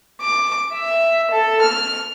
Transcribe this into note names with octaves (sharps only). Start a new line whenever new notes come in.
D6
E5
A4
F6